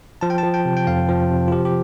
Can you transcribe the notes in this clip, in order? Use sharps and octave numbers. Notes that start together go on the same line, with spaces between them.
F3 A5
G5
A5
F3
G5
C3
G5
F2 F5
F3
C3
F4
F3 G4
G4